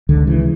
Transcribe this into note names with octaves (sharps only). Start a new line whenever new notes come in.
C#2 D3
C#3 E3